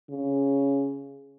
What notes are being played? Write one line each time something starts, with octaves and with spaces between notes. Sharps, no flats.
C#3